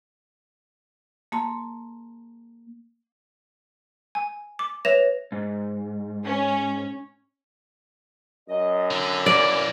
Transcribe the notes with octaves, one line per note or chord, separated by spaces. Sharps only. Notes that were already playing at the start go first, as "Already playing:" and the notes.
A#3 A5 C6
G#5
D6
B4 C#5 E5 A#6 E7 F7
G#2
C#4
F#2 D#5
D3 D#4
E3 A#3 D5